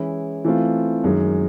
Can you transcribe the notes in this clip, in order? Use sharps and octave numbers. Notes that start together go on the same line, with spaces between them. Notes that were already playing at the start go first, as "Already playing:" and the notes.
Already playing: E3 G#3 C#4 E4
E3 A3 C4 F4
F#2 D#3 G#3